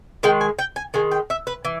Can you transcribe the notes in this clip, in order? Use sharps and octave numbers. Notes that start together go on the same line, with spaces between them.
D#3 G#3 G5
G#5
G5
G#5
D#3 G#3 G#5
G5
E5
B4
E3